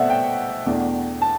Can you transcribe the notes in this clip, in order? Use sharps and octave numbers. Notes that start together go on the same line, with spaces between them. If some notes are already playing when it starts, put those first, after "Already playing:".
Already playing: B2 A3 C4 D5 E5 F#5
G5
E2 B2 A3 D4
A5